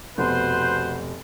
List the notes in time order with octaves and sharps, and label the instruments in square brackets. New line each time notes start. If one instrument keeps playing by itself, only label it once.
[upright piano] F1 B2 [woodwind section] F#4 B4 C5